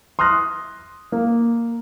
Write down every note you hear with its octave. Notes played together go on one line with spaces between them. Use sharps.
C6 D#6 F6 F#6 A#6
A#3